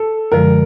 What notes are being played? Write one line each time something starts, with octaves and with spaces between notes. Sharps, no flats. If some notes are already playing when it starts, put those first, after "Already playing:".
Already playing: A4
F#2 D3 F3 G#3 A#4